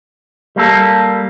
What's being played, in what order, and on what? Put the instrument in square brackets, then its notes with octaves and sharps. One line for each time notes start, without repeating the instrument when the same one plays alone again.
[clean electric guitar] G3 A#3 A4